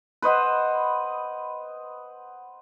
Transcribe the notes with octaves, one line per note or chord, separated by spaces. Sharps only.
B4 C5 D#5 F#5